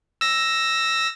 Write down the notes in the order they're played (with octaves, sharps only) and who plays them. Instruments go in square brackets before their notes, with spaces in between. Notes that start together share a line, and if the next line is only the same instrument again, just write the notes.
[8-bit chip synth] E6 A#6